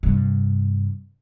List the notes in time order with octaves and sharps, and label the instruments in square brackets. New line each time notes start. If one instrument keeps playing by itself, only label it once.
[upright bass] G2 C3